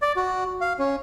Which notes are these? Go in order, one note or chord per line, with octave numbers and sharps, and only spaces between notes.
D5
F#4
F5
C#4